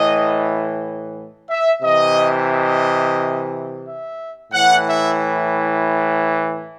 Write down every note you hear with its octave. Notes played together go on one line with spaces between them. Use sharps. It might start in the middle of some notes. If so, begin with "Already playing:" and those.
Already playing: A2 E3 D#5
E5
C3 E3 D#5
D#5
E5
A2 E3 F#5
E5